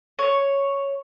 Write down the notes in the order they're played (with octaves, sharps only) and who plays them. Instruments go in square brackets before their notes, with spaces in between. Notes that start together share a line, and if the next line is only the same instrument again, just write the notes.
[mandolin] C#5